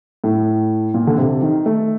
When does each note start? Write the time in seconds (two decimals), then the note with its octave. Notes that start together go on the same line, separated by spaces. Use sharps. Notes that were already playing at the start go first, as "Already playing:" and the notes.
0.24 A2
0.94 A#2
1.07 D3
1.18 C3
1.42 D#3
1.66 A3